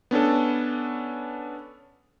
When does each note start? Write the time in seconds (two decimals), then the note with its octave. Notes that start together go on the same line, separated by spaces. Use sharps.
0.11 B3 C#4 D4 A4